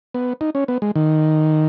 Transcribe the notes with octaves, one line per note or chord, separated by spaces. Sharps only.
B3
D#4
C#4
B3
G#3
D#3